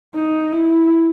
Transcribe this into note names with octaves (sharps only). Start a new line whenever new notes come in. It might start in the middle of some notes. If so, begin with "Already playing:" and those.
D#4
E4